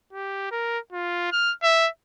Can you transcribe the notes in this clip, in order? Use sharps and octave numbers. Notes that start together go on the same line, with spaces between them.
G4
A#4
F4
F6
E5